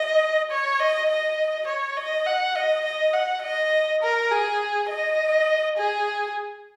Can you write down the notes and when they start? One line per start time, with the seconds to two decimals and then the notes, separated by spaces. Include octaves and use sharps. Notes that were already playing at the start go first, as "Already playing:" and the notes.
Already playing: D#5
0.51 C#5
0.80 D#5
1.09 D#5
1.67 C#5
1.97 D#5
2.26 F#5
2.56 D#5
2.85 D#5
3.14 F#5
3.43 D#5
4.02 A#4
4.32 G#4
4.89 D#5
5.78 G#4